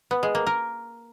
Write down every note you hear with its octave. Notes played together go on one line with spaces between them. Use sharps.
B3
G#3
A#3
A#4